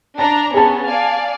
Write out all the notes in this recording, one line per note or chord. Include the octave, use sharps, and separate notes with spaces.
D4 A5 A#5
B3 C#4 G#4 A5
D5 F5 G#5